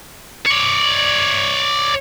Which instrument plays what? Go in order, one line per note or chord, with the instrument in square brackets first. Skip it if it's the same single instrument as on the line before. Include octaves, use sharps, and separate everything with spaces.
[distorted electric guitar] C#5 D5